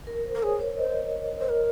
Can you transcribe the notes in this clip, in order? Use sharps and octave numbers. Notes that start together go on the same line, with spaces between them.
A#4
C5
A#4
G#4 C#5
C#5
C5 D#5
C5
A#4